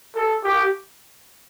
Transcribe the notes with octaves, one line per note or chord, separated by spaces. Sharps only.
A4
G4